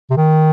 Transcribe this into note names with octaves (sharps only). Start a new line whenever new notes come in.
C3
D#3